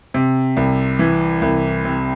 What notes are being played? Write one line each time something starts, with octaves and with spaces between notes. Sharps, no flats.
C3
C2
E3
C2
C3